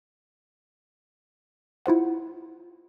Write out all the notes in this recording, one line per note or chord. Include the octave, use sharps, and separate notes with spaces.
E4 F4 C5 F#5